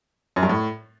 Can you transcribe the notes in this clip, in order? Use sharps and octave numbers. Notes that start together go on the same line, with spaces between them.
F#2
G2
A2